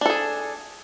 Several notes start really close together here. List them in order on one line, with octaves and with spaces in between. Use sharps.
D4 A4 G#4